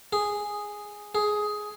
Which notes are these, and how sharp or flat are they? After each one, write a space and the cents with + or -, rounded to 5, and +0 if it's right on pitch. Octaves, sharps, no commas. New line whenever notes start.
G#4 -5
G#4 +10